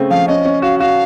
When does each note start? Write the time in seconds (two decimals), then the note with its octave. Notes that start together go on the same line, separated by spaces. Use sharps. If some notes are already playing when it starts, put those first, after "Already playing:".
Already playing: C#3 A3 C4
0.10 F3 F5
0.28 C#4 D#5
0.45 C#4
0.62 F#4 F5
0.80 F#4 F5